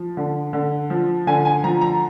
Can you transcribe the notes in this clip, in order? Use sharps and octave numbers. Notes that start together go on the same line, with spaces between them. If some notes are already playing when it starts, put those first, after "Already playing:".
Already playing: F3
D3
D3
F3
D3 G#5
G#5
F3 A#5
A#5